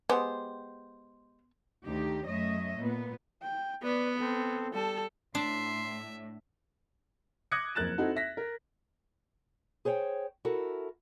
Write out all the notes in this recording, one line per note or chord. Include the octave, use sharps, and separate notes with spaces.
G#3 B3 G4 C5
D2 D#3 D#4 G4
F#2 A3 C#5 D#5 E5
A#2 B3
G5
B3 B4 D5
C4 A4
G3 A4 A5
A2 D4 E5 C6
D6 D#6 F#6 G#6 A#6 C#7
F#1 F2 A#4 F#6 A6 E7
C4 D#4 E4 F#4 A4
E5 A#6 B6
A#4
G#4 C5 C#5 F5 G5
E4 F#4 A4 A#4